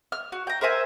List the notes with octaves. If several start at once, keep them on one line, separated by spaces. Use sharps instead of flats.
F6
F#4
G5 A#5
A#4 C5 E5 G#5